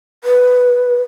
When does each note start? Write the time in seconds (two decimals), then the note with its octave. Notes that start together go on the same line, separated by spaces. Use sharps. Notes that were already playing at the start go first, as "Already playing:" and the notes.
0.24 B4